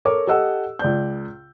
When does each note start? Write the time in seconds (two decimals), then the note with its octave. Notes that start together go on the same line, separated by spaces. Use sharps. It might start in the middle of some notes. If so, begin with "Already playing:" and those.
0.05 A4 A#4 C#5 D6
0.27 G4 A4 D#5 F#5 E6
0.79 C#2 D5 G6